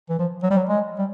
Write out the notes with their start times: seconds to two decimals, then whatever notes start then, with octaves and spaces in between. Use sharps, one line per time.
0.10 E3
0.19 F3
0.43 F#3
0.50 G3
0.57 F#3
0.68 G#3
0.98 G3